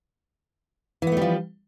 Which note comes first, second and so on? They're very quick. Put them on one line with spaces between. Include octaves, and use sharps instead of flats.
E3 B3 A3 G3 F3